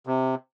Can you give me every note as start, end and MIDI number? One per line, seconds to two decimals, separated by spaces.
0.07 0.35 48